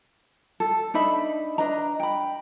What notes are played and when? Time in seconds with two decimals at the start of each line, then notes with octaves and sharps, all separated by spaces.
0.60 A4
0.94 D4 D#4 E5 B5
1.58 D4 B4 D#5 A#5
2.00 G5 B5